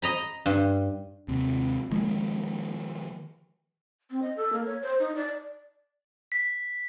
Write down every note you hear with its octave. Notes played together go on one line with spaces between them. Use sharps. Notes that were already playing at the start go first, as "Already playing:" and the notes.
D#5 A#5 B5
G2
D#2 C3
D#3 F3 G#3 A#3
C4
D#5
A4
A#3
C#5
C5
D#4
D5
B6